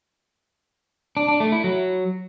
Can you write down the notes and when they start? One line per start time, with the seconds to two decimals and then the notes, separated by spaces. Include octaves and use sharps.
1.17 D4
1.28 D4
1.40 A3
1.52 E4
1.64 F#3